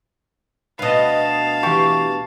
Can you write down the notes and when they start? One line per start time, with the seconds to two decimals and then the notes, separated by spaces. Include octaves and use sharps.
0.79 D2 B2 B4 D#5 F5 A5
1.63 E3 G4 C#6